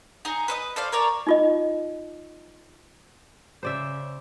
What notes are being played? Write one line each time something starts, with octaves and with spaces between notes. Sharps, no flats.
D#4 G#4 A#5
B4 C5 D#5
A4 C5 D5 F5
A#4 C#5 D5 A5
D#4 F4 D#5
C#3 C5 D5 E5